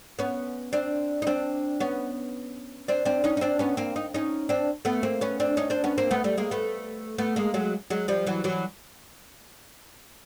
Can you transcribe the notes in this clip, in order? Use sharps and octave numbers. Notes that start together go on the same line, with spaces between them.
B3 C#4
C4 D4
D#4
C4 D4
B3 C#4
C4 D4
C4 D4
C#4 D#4
D#4
C4 D4
B3 C#4
A#3 C4
D#4
C#4 D#4
C4 D4
A3 B3
A#3 C4
B3 C#4
C4 D4
C#4 D#4
C4 D4
B3 C#4
A#3 C4
A3 B3
G3 A3
G#3 A#3
A3 B3
A3 B3
G#3 A#3
F#3 G#3
F#3 G#3
F3 G3
E3 F#3
E3 F#3